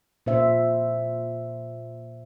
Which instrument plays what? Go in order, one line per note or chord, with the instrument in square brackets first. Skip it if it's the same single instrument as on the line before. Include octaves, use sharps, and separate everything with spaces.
[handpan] A#2 C5 E5